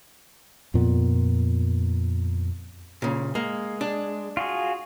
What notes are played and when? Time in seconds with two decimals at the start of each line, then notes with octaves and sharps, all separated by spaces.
0.74 F2 A#2 B3
3.02 A#2 C#3
3.35 G#3 A#3
3.81 D4
4.37 F4 F#4 G#4